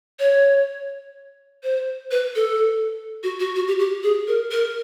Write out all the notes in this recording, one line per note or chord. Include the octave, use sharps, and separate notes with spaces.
C#5
C5
B4
A4
F#4
F#4
F#4
G4
G4
G#4
A#4
A#4